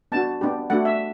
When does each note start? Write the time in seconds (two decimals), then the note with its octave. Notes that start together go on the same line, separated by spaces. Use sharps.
0.12 B3 D4 F#4 A5
0.41 B3 D4 G4
0.70 A3 D4 F#4 F#5
0.85 E5